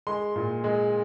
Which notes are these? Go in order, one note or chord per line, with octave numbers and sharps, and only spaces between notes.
G#3 C6
A#2
G#3